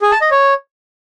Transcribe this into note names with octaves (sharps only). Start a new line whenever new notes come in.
G#4
A5
D#5
C#5